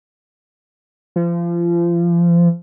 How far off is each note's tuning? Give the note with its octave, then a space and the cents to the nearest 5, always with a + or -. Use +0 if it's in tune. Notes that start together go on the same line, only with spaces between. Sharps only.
F3 -30